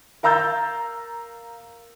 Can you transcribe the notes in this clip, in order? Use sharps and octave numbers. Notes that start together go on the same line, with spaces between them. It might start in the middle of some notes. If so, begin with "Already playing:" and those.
A#4 F5 A#5 E6 G6 A6